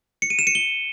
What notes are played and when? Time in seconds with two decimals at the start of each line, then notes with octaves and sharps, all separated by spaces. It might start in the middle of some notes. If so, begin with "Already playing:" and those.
0.22 C#7
0.30 D#7
0.39 E7
0.47 C#7
0.55 G7